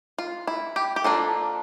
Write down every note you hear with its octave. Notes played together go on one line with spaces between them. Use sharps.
F4
E4
G4
G4
F3 A#3 D4 A4